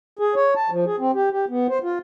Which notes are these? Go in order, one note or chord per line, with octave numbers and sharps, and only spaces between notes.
G#4
C#5
A5
F3
G#4
C4
G4
G4
B3
C5
F4